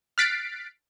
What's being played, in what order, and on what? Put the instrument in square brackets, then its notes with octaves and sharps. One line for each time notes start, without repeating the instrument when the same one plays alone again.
[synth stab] F6 F#6 A6 B6 C7 D7